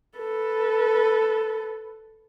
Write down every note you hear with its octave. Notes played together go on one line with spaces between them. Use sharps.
A4 B4